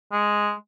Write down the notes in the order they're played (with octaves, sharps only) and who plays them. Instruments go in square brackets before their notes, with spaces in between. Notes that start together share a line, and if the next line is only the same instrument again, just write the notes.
[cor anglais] G#3